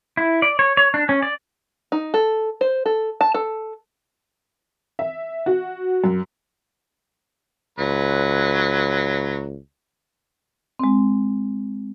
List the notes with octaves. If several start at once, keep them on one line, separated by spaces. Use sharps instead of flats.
E4
D5
C#5
C#5
D4
C#4
D5
D#4
A4
C5
A4
A5
A4
E5
F#4
F#2
C#2 F#3 B4
G#3 C4